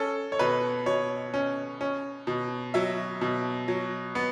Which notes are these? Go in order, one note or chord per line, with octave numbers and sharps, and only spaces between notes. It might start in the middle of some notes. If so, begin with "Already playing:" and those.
Already playing: C#4 A4
C#5
B2 B4
B2 C#5
C#4
C#4
B2
F#3 E5
B2
F#3
B3